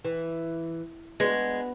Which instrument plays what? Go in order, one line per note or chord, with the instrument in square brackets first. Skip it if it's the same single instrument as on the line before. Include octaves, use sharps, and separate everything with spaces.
[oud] E3
[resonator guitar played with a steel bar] G#3 [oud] B3 D4 F#4